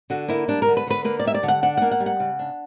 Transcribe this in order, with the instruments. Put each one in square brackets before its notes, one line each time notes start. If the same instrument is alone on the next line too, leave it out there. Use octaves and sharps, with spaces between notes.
[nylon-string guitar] D3 F#4
A#3 E4
G3 D4
A#4
D3
B4
D3 B4
A#3 B4
D5
G3 E5
D5
D3
F#5
D4 F#5
A#3 F#5
F#5
G3
F#5
C#3
D4